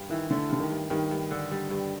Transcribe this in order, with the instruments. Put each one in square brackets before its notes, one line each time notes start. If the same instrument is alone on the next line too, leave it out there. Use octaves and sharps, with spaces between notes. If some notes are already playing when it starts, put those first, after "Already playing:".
Already playing: [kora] G2
[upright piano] D#3 [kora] E3
[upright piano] D3 [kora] A3
[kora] G2 [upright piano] D3
[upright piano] D#3
[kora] G2
[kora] G2 [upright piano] D#3
[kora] G2
D3
G3
G2